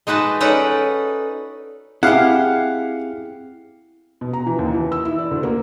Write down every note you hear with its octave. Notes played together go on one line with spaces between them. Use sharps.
G#3 D#4 F#4 B4 A5
C#4 D#4 A4 B4 D5 F#5
C4 E4 G4 G#4 F5 F#5
B2
A#5
E3
D#2
E3
E6
E4
D5
D2
A#3